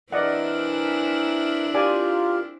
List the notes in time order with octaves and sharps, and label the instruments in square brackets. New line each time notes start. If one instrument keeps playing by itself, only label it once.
[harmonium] E3 A#4 [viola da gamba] C4 D4 E4 [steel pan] D5 D#5 F#5
[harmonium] F4 G4 A#4 [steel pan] D5 G#5 D6